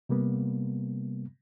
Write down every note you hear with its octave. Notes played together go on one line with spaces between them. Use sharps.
C3 G3 A#3 B3